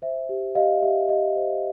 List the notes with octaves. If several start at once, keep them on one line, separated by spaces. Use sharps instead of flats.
C5 E5
G4
G4 D#5 F5
G4 E5
G4 D#5
C5